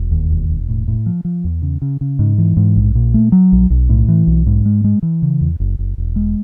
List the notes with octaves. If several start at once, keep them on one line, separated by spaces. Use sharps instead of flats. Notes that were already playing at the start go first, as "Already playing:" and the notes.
Already playing: E1
D#2
E1
E1
A2
A2
F3
F3
E2
C#3
C#3
C#3
G#2
E3
G#2
A#1
A#2
A3
F#3
A#1
B1
A2
E3
B1
G#2
G#3
G#3
E3
C#3
E2
F#1
F#1
E1
G#3